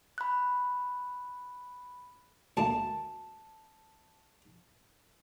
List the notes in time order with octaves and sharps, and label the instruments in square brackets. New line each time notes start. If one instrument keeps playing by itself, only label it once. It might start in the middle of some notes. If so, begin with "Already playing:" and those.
[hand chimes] B5 F#6
[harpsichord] D2 A3 A#3 [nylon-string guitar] A5